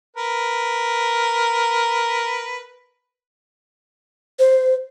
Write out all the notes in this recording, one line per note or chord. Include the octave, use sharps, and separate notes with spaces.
A#4 B4
C5